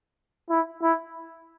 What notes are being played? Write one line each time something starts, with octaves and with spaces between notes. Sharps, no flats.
E4
E4